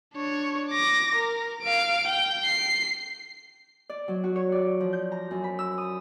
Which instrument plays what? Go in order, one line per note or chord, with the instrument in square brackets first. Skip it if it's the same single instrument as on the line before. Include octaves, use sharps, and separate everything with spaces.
[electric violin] D4 C#5
D6 A#6
A#4
F5 D7
G5
C7
[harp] D5
F#3
F#4
C#5
D5
F3
G6
A#5
F#2
B5
E6
D#6